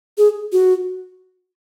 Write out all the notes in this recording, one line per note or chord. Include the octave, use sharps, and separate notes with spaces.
G#4
F#4